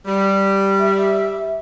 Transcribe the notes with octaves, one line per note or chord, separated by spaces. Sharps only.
G3
E5